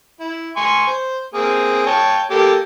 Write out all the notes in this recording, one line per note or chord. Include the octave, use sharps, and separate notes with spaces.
E4
G#5 C6 C#6
C5
A#3 C4 G#4
C#5 G5 A5
A#3 G4 A4